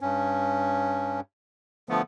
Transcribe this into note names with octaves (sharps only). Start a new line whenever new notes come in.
G2 C#4
D3 F3 A3 B3